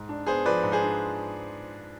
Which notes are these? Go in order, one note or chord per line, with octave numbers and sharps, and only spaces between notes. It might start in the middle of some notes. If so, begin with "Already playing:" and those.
Already playing: G#2
D4
B3 G#4 C5
F3 B4 D5
G#2
G#4 C5
D4